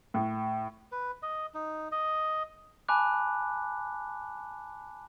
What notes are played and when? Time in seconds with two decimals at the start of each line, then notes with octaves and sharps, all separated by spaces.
0.14 A2
0.92 B4
1.22 D#5
1.54 D#4
1.92 D#5
2.89 G#5 A5 B5 D6 F#6